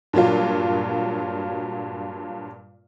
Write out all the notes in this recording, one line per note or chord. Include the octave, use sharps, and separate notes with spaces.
G2 A#2 F#3 F4